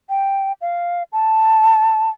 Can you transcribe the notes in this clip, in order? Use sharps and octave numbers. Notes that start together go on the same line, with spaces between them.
G5
F5
A5